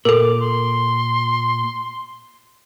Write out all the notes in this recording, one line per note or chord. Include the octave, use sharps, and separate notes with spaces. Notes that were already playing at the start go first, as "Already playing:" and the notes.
A#2 A4 A#4 D6
C6